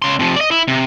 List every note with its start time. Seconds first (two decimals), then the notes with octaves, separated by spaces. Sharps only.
0.02 C#3 C6
0.19 C3 F3
0.36 D5 D#5
0.51 E4
0.68 C3